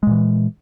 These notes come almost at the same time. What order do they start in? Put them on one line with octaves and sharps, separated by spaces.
G#3 A#2 E3